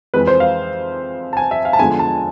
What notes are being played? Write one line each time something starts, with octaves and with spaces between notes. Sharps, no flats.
F2 E3 G#3 B4
C5
F5
A5
G#5
E5
F5
A5
E2 D3 F3 G#3 G#5
A5